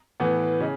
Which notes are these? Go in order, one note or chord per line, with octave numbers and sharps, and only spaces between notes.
A2 E3 B3 B4
C#3 D#5